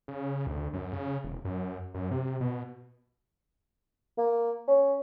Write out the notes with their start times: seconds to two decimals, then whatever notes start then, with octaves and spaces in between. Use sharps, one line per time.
0.08 C#3
0.47 D2
0.73 F#2
0.93 C#3
1.24 E1
1.45 F#2
1.94 F#2
2.11 C3
2.41 B2
4.18 A#3
4.68 C#4